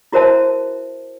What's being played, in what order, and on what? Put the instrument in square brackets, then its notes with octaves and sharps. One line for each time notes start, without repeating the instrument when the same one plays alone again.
[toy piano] E4 F#4 A#4 C5 E5 A5